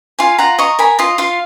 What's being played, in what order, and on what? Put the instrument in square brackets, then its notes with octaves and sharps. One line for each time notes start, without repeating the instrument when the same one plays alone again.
[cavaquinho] F4 F5 G#5
F4 F#5 A#5
D#5 A#5 C#6
A#4 G#5 B5
F4 D#5
F4 F5